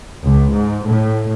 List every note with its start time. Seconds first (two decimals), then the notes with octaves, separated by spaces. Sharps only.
0.23 C#2
0.53 G#2
0.88 A2